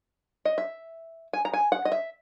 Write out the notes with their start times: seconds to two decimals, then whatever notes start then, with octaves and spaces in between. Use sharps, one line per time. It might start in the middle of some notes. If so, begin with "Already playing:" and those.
0.45 D#5
0.58 E5
1.33 G#5
1.45 A#5
1.54 G#5
1.72 F#5
1.85 D#5
1.92 E5